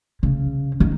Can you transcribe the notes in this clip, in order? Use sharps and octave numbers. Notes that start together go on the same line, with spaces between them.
C#3
D#3